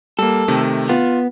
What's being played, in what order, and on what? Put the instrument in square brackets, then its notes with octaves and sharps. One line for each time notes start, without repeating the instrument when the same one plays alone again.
[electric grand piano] G3 A#3 [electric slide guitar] A4
[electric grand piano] C3 D#3 A3
[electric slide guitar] B3 [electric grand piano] F4